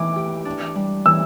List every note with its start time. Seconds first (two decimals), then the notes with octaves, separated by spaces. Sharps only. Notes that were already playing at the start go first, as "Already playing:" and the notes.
Already playing: E3 A3 E4 D6
0.16 G4
0.45 D4
0.75 G3
1.05 E3 E6